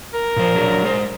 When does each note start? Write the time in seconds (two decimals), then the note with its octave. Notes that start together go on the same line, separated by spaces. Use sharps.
0.14 A#4
0.36 A#2 F3 C5
0.55 F#3 D4 G#4
0.83 G#3 C5